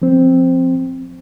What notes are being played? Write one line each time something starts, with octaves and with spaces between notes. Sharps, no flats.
F3 C4